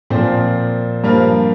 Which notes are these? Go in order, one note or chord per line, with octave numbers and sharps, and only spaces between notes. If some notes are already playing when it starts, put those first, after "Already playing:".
A#2 F3 C4 C5
G2 F3 A#3 A#4